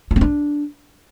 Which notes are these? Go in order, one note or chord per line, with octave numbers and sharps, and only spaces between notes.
F4
C4
D4